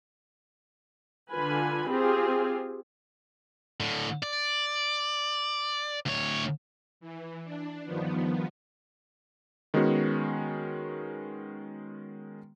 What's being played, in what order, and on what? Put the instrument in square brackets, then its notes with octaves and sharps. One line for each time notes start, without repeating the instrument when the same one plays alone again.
[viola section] D3 F4 B4 G#5 B5
C4 F4 G4 G#4
[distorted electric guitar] A2 D3
D5
D2 C#5
[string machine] E3
D4
G2 D#3 F3 B3
[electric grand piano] D#3 G#3 B3 C#4 F#4